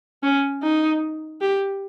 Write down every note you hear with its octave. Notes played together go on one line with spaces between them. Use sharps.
C#4
D#4
G4